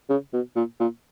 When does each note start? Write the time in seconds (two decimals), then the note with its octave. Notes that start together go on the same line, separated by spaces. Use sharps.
0.09 C#3
0.33 B2
0.56 A#2
0.80 A#2